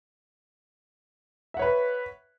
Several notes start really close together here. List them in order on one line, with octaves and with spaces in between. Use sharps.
E5 F#5 C#5 B4